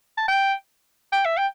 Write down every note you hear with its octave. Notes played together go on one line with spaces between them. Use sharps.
A5
G5
G5
E5
G5